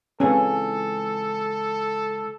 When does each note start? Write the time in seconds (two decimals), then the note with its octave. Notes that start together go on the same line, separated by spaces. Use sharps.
0.20 C#2 E3 G#3 C4 C#4 G#4 A4 B4